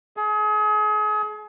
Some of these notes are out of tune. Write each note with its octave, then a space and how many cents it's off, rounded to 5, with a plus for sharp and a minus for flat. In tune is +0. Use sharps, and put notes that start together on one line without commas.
G#4 +35